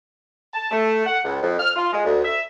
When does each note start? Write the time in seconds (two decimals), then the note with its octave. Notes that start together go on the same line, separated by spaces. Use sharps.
0.54 A5
0.71 A3
1.06 F#5
1.24 C#2
1.42 F2
1.59 F6
1.76 F4
1.93 G#3
2.05 D2
2.24 E5